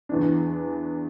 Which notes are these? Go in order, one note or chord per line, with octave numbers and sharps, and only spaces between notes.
E2 E3 D4